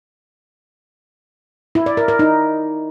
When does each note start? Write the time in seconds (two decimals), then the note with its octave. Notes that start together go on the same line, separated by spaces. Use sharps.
1.75 E4
1.86 D5
1.97 A#4
2.08 A#4
2.19 D#4